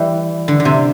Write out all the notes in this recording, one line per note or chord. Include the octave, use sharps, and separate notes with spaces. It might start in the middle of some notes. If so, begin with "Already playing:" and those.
Already playing: E3 G3
D3
D3
C3